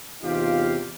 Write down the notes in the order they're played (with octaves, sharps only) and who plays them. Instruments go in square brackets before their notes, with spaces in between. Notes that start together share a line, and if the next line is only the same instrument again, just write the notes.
[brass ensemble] E2 C3 D#4 F4 G4 F5